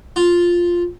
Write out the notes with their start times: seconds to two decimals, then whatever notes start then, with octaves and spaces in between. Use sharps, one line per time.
0.16 F4